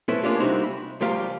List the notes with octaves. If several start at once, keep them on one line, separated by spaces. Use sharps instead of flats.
C4 C#4 E4 A4 B4
G#3 A#3 C#4 D4 F4 G4
C3 G3 C4 D#4 E4 F#4
B5
C#2 F3 G3 G4 F5 A#5